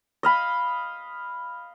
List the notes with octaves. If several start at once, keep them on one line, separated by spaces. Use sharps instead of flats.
D#5 F5 B5